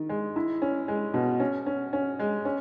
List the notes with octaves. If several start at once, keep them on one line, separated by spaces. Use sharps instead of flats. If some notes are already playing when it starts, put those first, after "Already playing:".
Already playing: D#3
G#3
E4
C#4
G#3
B2
C#4
C#4
C#4
G#3
C#4